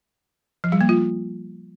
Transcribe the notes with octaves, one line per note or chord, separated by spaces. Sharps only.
F3
G3
A#3
F4